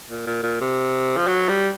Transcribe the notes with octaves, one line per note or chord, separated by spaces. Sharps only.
A#2
A#2
A#2
C3
F3
F#3
G3